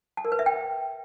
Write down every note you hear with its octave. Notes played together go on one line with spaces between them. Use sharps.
A5
A#4
B4
E5
G5